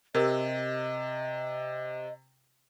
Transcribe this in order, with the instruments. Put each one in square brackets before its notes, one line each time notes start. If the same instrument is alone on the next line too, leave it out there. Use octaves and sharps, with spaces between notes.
[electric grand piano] C3 [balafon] G4 A#4 [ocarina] D#5